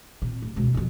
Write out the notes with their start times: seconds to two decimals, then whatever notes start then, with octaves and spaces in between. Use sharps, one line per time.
0.22 A#2 C4
0.42 D1
0.56 C#2 B2
0.74 B1 F2